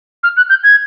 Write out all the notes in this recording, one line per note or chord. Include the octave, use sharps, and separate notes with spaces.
F6
F#6
G6
G#6